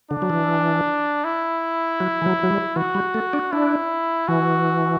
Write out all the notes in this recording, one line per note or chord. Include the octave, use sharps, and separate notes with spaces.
D3 D4
F#3
E3
E4
F#3
E3
F#3
F#3
G3
E3 F#4
G3
A3
D4
D4 E4
E3 F#4